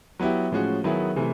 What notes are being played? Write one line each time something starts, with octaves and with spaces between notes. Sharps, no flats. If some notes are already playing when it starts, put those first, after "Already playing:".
F#3 B3 E4 G4
A2 F3 G#3 C#4 F#4
D#3 F#3 B3 E4 G#4
C3 E3 A3